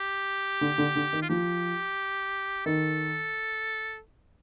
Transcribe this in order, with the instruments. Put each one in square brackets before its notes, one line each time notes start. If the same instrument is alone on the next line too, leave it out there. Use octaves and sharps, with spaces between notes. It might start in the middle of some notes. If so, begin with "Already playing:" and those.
Already playing: [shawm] G4
[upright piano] D3
D3
D3
D#3
[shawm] F4
[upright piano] F3 [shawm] G4
[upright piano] D#3 [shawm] A4